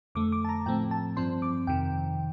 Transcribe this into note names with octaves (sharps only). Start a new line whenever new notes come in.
F2 D3 A3 D6
D6
A5
A#5
A2 F3 A3 C4 G5
A5
G2 F3 C4 C6
D6
F2 C3 D#3 G5